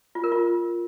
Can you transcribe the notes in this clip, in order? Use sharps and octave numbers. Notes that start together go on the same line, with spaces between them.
F4
A#4
F4